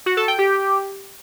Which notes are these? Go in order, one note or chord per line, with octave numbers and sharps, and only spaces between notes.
F#4
A4
G5
G4